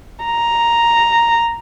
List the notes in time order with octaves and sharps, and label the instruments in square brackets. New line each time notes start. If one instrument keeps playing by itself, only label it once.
[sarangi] A#5